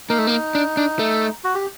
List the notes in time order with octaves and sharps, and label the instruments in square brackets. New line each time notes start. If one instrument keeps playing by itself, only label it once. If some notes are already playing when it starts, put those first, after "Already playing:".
[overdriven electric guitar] A#3 [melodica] D#4
[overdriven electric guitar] A3
A#3
D4
D4
A3
[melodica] F#4
G4